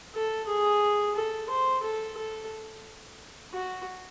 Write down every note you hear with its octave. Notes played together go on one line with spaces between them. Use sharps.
A4
G#4
A4
C5
A4
A4
F#4